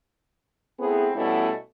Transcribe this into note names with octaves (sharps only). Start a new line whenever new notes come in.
A3 B3 C4 E4 G#4 B4
B2 G3 A3 B3 C#4 E4